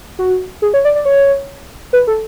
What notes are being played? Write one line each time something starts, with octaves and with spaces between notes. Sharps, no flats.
F#4
G#4
C#5
D5
D5
C#5
B4
A4